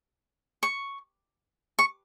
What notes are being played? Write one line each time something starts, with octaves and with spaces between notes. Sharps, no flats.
C#6
C#6